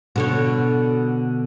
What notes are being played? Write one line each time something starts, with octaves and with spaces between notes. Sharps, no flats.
B2 D3 C#5